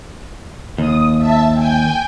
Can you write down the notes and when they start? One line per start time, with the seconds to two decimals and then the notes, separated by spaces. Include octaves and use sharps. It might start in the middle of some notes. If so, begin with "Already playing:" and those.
0.78 D#2 D#6
1.17 E5 A5
1.53 G5 G#5 G6